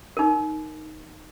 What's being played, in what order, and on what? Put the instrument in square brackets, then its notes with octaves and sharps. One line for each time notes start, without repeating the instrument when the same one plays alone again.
[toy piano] D#4 A#4